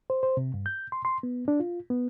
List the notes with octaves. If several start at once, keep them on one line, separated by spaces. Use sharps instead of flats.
C5
C5
C3
G2
G6
C6
C6
B3
D4
F4
B3